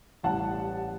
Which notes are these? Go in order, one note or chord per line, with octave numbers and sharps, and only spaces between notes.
A1 A2 G3 F#5 A5